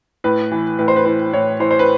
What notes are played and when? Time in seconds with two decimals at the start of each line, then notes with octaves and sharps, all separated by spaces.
0.24 A2 B4
0.52 E3
0.79 A2 B4
0.88 C5
0.96 B4
1.06 E3 C5
1.33 A2 C#5
1.60 E3 C5
1.71 C5
1.79 B4